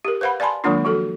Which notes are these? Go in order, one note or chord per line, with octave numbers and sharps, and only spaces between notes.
G4 A#4
B4 C5 F5 F#5 B5
D5 F5 G#5 A5 B5 C6
D#3 F#3 G#3 A#3 D4 F4
F3 F#4 A4